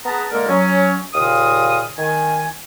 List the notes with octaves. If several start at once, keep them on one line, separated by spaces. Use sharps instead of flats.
B3 G#4 B4 A5 A#5
D3 G#3 A#3 A4 A#4
F#3 C#4
D#2 A#2 C#3 F5 D#6
D#3 G#5